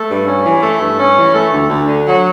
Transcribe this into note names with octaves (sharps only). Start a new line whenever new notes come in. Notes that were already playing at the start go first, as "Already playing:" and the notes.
Already playing: A3
G2
C#4
E3
A3
G2
C#4
E3
A3
D2
D2
D3
F#3